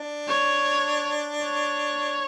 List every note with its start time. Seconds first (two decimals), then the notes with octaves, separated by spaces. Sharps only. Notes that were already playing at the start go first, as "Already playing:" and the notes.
Already playing: D4
0.28 C#5
1.44 C#5